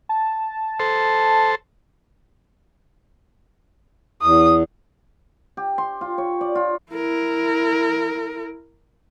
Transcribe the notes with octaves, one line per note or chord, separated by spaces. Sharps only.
A5
A4 C5
E2 D#6
G4
C6
F4
C#5
D5
F4
E4 A#4